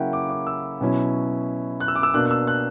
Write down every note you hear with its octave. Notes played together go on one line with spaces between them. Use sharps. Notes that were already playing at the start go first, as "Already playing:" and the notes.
Already playing: C#3 F#3 A#3 C#4 E4 E5 F#5 G5
D6
D6
E6
B2 F#3 C#4 E4
F#6
E6
D6
E6
B2 A#3 D4 F#6
F#6
E6
F#6